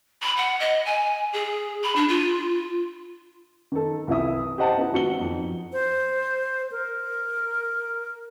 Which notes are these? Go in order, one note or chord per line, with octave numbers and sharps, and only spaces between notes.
B5
F#5
D#5
G#5
G#4
B5
D4
F4
D#3 A4
C2 E3 E4 E5 D#6
G4 C5 D#5 F#5 A5
B3 D#4 E4
G#1 F#4 C#7 G7
F2 D#4
C5
A#4